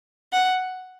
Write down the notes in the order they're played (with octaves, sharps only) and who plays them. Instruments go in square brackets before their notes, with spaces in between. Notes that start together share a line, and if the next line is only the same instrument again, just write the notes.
[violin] F#5